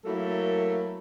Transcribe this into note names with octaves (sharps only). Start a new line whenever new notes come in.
F#3 A3 A#3 E4 A4 A#4